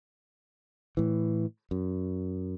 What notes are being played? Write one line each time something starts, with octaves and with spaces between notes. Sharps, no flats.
A2 E3
F#2